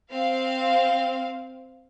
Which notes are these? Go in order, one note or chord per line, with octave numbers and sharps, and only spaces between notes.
C4 F5